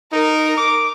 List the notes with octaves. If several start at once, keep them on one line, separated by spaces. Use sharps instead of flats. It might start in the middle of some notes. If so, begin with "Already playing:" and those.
D#4 A#4
D6